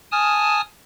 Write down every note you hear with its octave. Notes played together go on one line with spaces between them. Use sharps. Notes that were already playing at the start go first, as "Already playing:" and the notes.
G#5 A5 D#6 F6